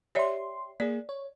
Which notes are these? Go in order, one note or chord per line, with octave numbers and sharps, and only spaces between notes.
G4 C#5 D5 E5 C6
A#3 G#4 D5
C#5